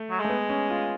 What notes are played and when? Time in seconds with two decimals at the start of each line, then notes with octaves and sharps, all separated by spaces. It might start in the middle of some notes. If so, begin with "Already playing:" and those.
Already playing: A3
0.10 F#3
0.20 G#3 A3
0.30 B3
0.49 C#4
0.70 F4